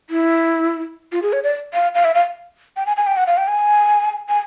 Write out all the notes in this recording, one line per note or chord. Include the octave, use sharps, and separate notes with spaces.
E4
F4
G#4
C#5
D5
F5
F5
E5
F5
G5
G#5
G#5
G5
F#5
F5
G5
G#5
G#5